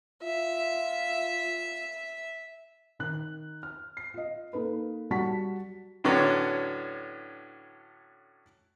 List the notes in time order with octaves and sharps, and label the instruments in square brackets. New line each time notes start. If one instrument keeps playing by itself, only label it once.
[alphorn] F4 [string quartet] E5
[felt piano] D#3 F#6
F6
C7
F4 D#5
A#3 D#4 A4 B4
F#3 G3 F#5 A5 C#6 B6
[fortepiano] A2 D3 F#3 B3 C#4 D4